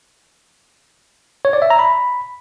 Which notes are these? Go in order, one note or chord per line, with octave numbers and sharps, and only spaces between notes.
C#5
D5
E5
A#5
B5